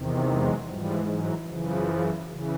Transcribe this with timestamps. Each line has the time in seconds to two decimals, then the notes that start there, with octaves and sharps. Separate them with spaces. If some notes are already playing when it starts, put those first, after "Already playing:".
Already playing: E2 C3 D#3
0.26 F#3 G#3
0.66 G#2 E3 F3 G3
1.05 E3 F#3
1.45 F#2 C#3 E3 F3
2.26 C#3 E3